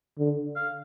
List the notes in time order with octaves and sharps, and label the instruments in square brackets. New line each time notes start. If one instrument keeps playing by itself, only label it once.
[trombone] D3
[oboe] F5